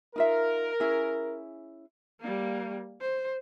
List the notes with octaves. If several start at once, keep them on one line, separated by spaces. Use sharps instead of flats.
D#4 F4 A#4 E5
C#4 E4 G#4
G3 A#3
C5